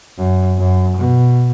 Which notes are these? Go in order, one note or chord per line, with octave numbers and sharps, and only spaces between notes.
F#2
F#2
B2